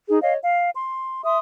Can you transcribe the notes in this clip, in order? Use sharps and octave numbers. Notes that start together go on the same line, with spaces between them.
D#4 G#4
C#5 D#5 F5
F5
C6
E5 C6 D#6